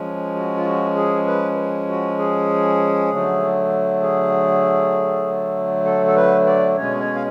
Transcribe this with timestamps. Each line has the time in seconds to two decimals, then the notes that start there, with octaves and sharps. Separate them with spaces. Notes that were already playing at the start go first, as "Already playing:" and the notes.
Already playing: F3 G#3 C#4
0.35 F#4
0.56 F4
0.65 F#4
0.96 G#4
1.27 B4
1.88 F#4
2.18 G#4
3.10 D3 F#3 A3
4.02 G#4
5.85 A4
6.06 A4
6.16 B4
6.46 D5
6.77 B2 G#3 C#4 C#5
7.00 C#5
7.15 F5